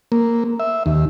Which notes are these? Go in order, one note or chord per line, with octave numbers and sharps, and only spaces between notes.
A#3
E5
D#2